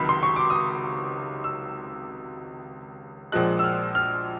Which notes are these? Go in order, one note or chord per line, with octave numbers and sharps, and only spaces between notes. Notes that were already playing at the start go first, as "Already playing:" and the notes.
Already playing: C#2 C3 D#3 F#3 B5
C6
C#6
D6
D#6
E6
A#1 A#2 F3 G#3 F#6
E6
F6
F6